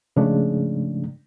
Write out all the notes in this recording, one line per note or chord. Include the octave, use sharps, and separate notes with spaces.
G#2 C#3 F3 G#3 A3 D4